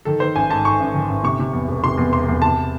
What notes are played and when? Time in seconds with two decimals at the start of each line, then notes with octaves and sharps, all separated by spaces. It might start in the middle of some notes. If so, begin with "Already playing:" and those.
0.05 D#3 A4
0.20 D#3 C5
0.36 A1 G#5
0.50 G#2 A5
0.64 G#2 C#6
0.80 A1
0.94 D#3
1.09 A1
1.24 C3 C#6
1.39 C3
1.53 E2
1.68 E1
1.84 C3 C6
1.97 E2
2.13 E1 C6
2.28 E2
2.42 C3 A5